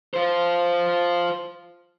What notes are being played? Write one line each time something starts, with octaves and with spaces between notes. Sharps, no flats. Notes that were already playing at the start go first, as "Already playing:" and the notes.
F4 C5